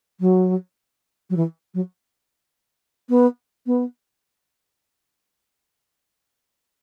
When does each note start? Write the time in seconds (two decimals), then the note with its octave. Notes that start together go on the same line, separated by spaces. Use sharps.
0.20 F#3
1.30 F#3
1.36 E3
1.74 F#3
3.09 B3
3.66 B3